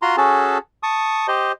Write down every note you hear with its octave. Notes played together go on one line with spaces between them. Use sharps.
F4 F#4 A#5 C6
C#4 F#4 G#4 A4 A5
A5 C#6 D#6
G4 C5 D#5